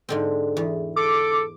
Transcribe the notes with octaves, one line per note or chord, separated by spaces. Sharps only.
G#2 D3 C4
E2
A4 D6